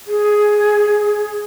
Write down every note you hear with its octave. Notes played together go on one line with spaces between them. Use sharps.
G#4